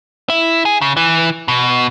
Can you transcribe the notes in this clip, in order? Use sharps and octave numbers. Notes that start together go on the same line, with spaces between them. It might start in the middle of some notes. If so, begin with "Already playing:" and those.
E4
G#4
C#3
E3
B2